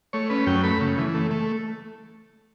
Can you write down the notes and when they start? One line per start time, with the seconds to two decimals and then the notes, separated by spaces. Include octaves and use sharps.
0.13 A3 C#5
0.30 C#4 B4
0.47 F#2 G5
0.63 A3 B5
0.81 C#3
0.98 E3
1.15 A3
1.31 A3